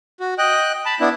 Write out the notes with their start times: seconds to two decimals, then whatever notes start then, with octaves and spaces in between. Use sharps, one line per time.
0.20 F#4
0.38 D#5 G5 F#6
0.86 A5 B5
1.00 B3 D4 E4